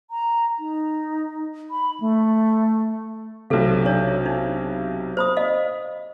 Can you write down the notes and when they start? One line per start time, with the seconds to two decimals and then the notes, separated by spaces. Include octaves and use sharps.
0.11 A#5
0.59 D#4
1.70 B5
2.00 A3
3.50 B1 C3 A4 F5
3.85 D4 C#5
4.25 D4 D#4
5.17 C5 B5 D#6
5.37 D#5 F5